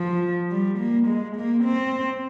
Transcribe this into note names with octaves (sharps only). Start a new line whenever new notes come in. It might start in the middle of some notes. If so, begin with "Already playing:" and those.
Already playing: F3
G3
A#3
G#3
A#3
C4